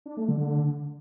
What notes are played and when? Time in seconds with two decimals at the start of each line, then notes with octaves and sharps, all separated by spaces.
0.06 D4
0.17 A3
0.29 D3